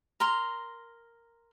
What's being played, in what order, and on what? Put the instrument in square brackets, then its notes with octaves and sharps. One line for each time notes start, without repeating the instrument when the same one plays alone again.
[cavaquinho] A#4 A#5 C6